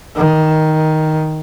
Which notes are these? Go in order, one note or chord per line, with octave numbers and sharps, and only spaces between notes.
D#3